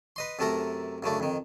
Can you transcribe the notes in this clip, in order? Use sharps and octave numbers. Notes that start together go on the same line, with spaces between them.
B4 D#5 C6
F#2 C3 A3 A4 A#4 A#5
F#2 C#3 A3 D4
F2 D#3